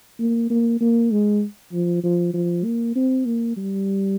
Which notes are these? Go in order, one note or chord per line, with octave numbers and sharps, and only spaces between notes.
A#3
A#3
A#3
G#3
F3
F3
F3
A#3
C4
A#3
G3